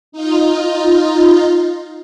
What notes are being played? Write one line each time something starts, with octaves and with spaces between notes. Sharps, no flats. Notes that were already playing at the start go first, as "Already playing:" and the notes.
D#4 F4